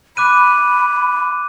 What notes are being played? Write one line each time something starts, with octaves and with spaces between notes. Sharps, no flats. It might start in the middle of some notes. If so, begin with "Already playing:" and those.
B5 D6 F#6 D#7